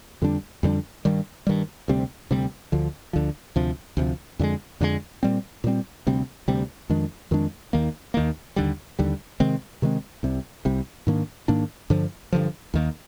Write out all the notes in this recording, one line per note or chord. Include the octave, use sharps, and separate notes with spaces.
F2 D3 G3 D4
F2 D3 G3 D4
G2 D#3 G3
G2 D#3 G3
D2 C3 G3 C4
D2 C3 G3 C4
D2 D3 F3
D2 D3 F3
D2 C3 F3
D2 C3 F3
F2 D3 F3 G#3
F2 D3 F3 G#3
A#2 G3 C4
A#2 G3 C4
D2 C3 G3 C4
D2 C3 G3 C4
F2 D#3 G#3 D4
F2 D#3 G#3 D4
D#2 D#3 A#3
D#2 D#3 A#3
D#2 D3 G3
D#2 D3 G3
C3 D#3 G#3 C4
C3 D#3 G#3 C4
C2 C3 G3
C2 C3 G3
G#2 D#3 A#3 D4
G#2 D#3 A#3 D4
G2 D3 F3
G2 D3 F3
D#2 D#3 A#3